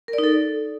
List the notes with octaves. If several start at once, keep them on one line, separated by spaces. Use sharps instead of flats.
A#4
D5
D#4
A4